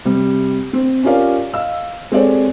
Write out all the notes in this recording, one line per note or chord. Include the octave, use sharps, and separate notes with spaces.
C3 G3
C4
C#4 F4 G4 A#4 D5 F5
D#5 F5 E6
G#3 C4 G4 A4 C#5 D5